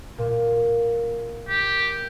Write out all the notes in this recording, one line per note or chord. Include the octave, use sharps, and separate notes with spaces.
A#2
G4